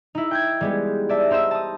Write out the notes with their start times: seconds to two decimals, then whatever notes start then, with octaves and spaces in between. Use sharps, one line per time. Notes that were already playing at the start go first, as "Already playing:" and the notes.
0.15 D#4 E4
0.31 G5 G6 G#6
0.61 G3 G#3 B3
1.09 D5 E5 A5
1.31 D#4 C5 E6 E7
1.51 A5 D#6